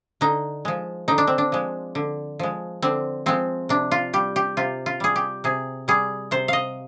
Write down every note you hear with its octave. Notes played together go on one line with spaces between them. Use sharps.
D3 D#4
F3 G#3
D3 D#4
D4
C4
D4
F3 G#3
D3
F3 G#3
D3 C4
F3 G#3 C4
C3 D4
F4
G3 G4
G4
C3 F4
F4
G3 G#4
G4
C3 G#4
G3 G#4
C3 C5
D#5 F5